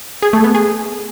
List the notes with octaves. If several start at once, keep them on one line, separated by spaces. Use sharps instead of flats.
G#4
A3
B3
G#4